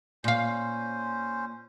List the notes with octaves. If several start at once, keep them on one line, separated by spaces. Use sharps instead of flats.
A#2 C#4 C5 F5